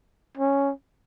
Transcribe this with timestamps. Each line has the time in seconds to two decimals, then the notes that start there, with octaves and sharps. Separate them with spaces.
0.38 C#4